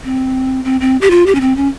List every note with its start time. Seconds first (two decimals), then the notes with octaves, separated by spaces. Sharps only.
0.04 C4
0.65 C4
0.81 C4
1.01 G4
1.11 F4
1.26 G4
1.35 C#4
1.41 C4
1.56 C#4